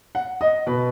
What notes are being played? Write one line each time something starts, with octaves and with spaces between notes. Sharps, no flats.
F#5
D#5
B2 B4